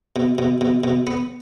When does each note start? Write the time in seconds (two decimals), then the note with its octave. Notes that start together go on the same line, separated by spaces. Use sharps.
0.16 B2
0.38 B2
0.61 B2
0.84 B2
1.07 B3